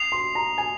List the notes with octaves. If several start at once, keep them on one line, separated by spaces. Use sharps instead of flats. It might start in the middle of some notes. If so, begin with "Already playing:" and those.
Already playing: D#6 C7 F7
C6
A#5
G#5